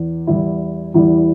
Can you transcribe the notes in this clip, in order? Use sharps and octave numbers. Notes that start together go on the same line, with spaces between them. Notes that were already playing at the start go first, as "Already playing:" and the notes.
Already playing: E2
E2 E3 G3 E4
E2 E3 G3 E4